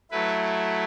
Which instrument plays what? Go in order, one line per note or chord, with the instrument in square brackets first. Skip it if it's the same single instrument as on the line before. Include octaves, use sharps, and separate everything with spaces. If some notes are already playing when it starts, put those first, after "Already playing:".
[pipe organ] F#3 A3 E4 B4